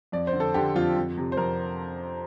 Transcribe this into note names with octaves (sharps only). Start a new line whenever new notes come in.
F2 D5
C5
D3
A4
D3 G4
F2 F4
F2
C3
C5
F2 A#4